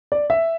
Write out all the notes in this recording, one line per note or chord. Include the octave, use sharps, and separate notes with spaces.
D5
E5